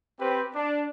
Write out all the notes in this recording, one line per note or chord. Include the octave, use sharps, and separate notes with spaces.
C4 G4 B4 C5
D4